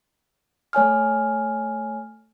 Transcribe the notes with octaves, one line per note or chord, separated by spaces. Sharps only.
A3 C#5 G#5 F6